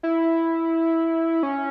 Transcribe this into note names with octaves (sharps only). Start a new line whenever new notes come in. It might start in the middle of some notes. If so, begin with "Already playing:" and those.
E4
C#4